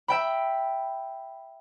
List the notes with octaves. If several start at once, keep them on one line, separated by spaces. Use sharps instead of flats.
E5 G5 B5